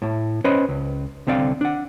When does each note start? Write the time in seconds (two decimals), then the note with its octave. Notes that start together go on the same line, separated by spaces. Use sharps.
0.02 A2 A3
0.44 C#4 B4 C5 D#5 B5
0.69 C#2
1.27 C2 D3 C4 D5 F5
1.61 D4 F#5